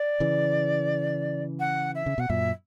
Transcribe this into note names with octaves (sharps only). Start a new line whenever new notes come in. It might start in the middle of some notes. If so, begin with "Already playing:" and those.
Already playing: D5
C#3 E3
F#5
E5
C#3
B2 F#5
F#2 A#2 E5